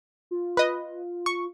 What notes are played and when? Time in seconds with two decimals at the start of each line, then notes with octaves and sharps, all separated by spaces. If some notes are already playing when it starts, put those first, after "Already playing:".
0.31 F4
0.57 B4 D#5
1.26 C#6